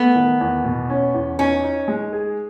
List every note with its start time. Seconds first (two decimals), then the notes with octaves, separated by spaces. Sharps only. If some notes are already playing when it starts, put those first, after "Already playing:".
Already playing: A3 B3
0.15 D#3
0.41 E2
0.64 B2
0.90 C#4
1.14 E2
1.39 C#4 D#4
1.64 D#4
1.88 G#3
2.13 G#4